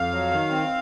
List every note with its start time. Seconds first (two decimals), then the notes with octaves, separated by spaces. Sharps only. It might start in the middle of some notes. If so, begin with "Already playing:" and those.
Already playing: F2 F5
0.11 F#3
0.31 D#3
0.50 C4